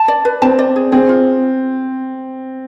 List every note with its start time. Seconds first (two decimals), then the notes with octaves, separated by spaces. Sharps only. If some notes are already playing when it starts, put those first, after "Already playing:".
Already playing: A5
0.08 D5
0.25 B4
0.42 C4 A5
0.59 D5
0.76 G#4
0.92 C4 G#4
1.09 F4